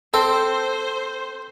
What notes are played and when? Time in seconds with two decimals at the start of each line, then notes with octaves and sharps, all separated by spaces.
0.14 C4 A4 C5